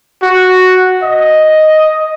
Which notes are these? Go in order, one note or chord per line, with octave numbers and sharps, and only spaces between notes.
F#4
D#5